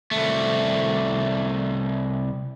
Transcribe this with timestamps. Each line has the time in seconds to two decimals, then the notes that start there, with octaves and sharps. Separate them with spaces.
0.11 C2 A3